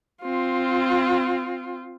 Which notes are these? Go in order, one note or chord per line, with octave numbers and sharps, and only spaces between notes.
C4 F4